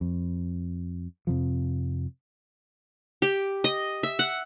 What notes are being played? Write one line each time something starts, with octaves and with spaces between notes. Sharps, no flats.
F2
F2 C3 F3
G4
D#5
E5
F#5